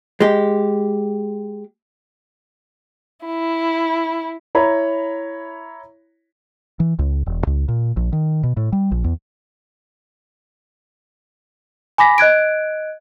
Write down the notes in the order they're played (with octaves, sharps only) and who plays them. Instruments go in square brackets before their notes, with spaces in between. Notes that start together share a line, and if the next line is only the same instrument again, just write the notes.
[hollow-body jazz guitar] G#3 G4
[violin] E4
[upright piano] E4 C#5 A#5 B5
[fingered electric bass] E3
C#2
E1
C#2
A#2
A#1
D#3
B2
A2
G3
A#1
E2
[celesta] G#5 B5 D6 A#6 B6
D#5 F#6 G#6 D7